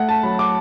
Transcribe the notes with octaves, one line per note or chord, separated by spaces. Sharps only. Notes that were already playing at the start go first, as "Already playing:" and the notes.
Already playing: A3 F#5
A5
F#3 B5
D6